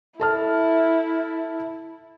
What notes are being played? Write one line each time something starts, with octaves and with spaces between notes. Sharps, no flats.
E4 A4 A5 F6